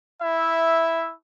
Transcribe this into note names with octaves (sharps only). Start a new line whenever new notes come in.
E4 E5